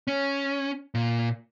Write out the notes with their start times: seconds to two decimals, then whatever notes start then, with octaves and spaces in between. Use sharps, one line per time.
0.08 C#4
0.95 A#2